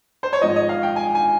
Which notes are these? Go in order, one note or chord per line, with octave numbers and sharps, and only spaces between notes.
C5
C#5
G#1 G#2 F3 D#5
D#5
F5
G5
G#5
G#5